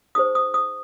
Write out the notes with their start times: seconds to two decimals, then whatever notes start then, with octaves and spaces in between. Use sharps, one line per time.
0.15 D#4 G#4 C5 D#6
0.35 D#6
0.54 D#6